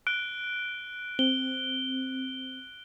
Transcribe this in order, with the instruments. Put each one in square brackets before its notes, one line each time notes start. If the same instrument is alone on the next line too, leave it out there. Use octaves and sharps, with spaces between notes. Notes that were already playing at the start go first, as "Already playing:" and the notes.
[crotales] F#6 D7 G7
[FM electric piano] C4 [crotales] G7